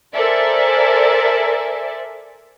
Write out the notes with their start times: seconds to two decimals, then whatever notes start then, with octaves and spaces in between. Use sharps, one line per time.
0.14 A4 A#4 C5 D5 E5 G#5